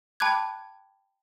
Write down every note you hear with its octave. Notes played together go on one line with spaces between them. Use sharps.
G5 A5 B5 D6 F#6 G#6